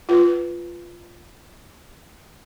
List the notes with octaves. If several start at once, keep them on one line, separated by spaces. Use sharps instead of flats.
F4 B4